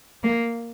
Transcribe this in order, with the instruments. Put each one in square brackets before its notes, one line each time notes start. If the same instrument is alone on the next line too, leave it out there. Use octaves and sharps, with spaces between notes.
[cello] A#3